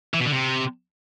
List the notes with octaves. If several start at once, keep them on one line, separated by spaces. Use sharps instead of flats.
E3
B2
D3
C3